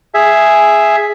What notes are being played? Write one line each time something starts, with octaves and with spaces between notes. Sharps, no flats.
G#4 E5